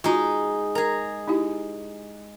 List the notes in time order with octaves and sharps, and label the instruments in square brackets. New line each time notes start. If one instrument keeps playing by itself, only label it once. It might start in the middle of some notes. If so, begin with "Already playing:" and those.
[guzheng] G#3 D#4 [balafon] F4 F#4
[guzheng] G#4 A#5 [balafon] A#4
[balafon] D#4 E4 G4